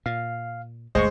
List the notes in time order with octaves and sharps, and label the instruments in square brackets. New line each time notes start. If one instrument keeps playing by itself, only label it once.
[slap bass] A#2 [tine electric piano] F5
[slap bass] G1 D2 [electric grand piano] G#3 C5 [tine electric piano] D#5 C#6